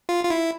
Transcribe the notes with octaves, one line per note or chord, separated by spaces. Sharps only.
F4
F4
E4